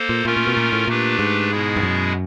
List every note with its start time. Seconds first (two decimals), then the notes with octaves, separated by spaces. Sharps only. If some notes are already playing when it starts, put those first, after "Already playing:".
Already playing: A#3 A4 C5
0.09 A#2
0.25 A#2 A3 C#4 F4 A#4
0.37 A#2
0.47 B2
0.57 A#2
0.72 A2
0.88 A#2 A3 D4 G4 B4
1.19 G#2
1.50 B2 G#3 B3 E4 G#4
1.76 G2
1.82 F#2